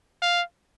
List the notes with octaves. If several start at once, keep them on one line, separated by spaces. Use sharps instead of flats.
F5